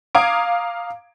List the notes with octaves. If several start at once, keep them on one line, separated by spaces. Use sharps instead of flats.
F5 A#5 D6 D#6 G#6 D7